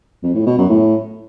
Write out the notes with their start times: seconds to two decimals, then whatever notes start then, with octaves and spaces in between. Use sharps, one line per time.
0.23 F2
0.35 A2
0.46 B2
0.58 F#2
0.69 A2